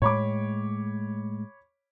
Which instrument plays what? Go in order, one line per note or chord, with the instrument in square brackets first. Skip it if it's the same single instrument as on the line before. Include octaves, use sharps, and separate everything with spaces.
[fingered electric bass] A2 G#3 [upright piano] C#5 B5 D6